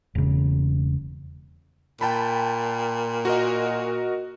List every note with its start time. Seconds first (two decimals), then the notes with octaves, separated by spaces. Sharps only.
0.15 E1 C#3
2.01 A#2 G5 A5 B5
3.25 F#4 A#4 D#5